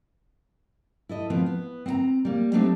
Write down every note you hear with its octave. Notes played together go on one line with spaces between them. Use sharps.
E4 A4 D#5
F3 B3 C4
B3
C4 F#5 A#5
G3 A#3
F#3 A3 C4 D4 D#4 G4